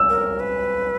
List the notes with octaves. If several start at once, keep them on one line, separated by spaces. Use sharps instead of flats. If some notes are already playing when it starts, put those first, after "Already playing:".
Already playing: E6
A#4
B4